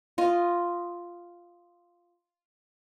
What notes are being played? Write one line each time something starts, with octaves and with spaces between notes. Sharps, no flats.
F4 D#5